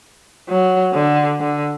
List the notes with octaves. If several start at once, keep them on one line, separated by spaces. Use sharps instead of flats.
F#3
D3
D3